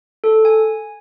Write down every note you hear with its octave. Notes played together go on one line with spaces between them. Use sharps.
A4
G#5